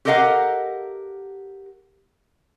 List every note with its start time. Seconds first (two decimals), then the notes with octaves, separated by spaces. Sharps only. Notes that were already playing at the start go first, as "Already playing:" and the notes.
0.05 G4 A4 A#4 D#5 F5 F#5